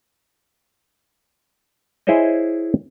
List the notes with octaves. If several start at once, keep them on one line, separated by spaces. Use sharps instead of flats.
E4 G#4 C5 C#5 D#5